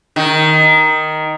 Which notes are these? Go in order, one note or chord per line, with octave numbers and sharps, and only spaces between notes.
D#3